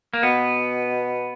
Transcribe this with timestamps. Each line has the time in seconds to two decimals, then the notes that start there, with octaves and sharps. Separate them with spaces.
0.13 A#3
0.23 B2 B3